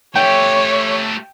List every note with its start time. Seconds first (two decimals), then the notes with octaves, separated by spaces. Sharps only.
0.16 A3 G4 C#5 G5